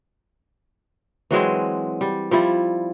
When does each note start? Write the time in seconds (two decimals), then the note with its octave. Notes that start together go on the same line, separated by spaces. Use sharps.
1.31 E3 F#3 G#3 C4
2.01 G3
2.31 F3 G3 E4